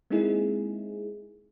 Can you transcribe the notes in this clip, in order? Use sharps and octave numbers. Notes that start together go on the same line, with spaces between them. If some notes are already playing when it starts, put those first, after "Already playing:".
G#3 A#3 C4 D#4 E4 G#4